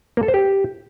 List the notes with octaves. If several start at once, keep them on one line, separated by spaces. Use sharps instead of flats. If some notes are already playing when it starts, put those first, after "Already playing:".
A#3
A4
C5
G4